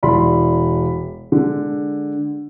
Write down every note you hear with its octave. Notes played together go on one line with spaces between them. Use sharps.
E1 E4 D5 B5 C6
D3 G#3